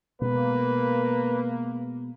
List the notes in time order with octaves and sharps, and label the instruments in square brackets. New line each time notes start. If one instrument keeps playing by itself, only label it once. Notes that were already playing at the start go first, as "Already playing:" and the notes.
[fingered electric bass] B2 G#3 B3 [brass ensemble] A#3 [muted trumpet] B4